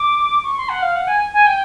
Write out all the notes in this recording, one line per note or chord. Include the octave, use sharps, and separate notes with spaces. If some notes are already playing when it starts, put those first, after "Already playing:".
Already playing: D6
C#6
C6
F#5
F5
F#5
G#5
G#5
G5